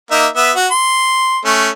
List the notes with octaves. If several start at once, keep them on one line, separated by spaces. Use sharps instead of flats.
A#3 D#4 E5
B3 E5
F#4
C6
A3 C#4